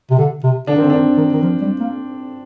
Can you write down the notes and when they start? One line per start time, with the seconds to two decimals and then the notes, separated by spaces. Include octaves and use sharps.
0.10 C3
0.18 D3
0.44 C3
0.67 D3 D4
0.75 D#3
0.79 C4
0.84 D3
0.90 D#3 D4
1.17 D#3
1.32 D#3
1.42 F3
1.61 G3
1.80 A#3